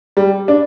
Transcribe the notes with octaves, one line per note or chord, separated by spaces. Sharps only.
G3
D4